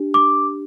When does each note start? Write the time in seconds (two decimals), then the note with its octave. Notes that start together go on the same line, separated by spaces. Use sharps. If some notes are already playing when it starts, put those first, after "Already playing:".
Already playing: D4 G4
0.14 D6